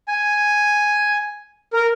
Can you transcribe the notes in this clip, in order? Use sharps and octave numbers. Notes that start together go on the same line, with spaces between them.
G#5
A#4